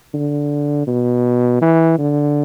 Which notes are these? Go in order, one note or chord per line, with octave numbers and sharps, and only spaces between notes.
D3
B2
E3
D3